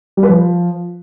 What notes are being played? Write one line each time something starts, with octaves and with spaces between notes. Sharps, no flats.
G3
B4
F3